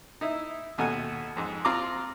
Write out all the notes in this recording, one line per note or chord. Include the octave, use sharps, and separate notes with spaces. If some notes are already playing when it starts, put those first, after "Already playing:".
D#4 E4
D#2 B2 A3 F#5 G#5
F2 G#2
C4 F4 A#5 C6 D6